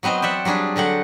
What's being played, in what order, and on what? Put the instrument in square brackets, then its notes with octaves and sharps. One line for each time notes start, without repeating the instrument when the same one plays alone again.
[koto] F#3 B3 C4 C5 D#5
C5 D5 E5 F#5
F#3 G3 D4 G#4 D5
D3 F#3 C4 F#5